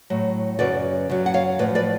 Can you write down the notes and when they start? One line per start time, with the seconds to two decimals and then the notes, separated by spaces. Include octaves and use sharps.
0.10 A2 F#3
0.59 F#2 C#3 F#3 B4 D5
1.10 F#2 C#3 F#3
1.26 F#5
1.34 C#5 F5
1.59 A2 F3 B4 D5
1.75 B4 D5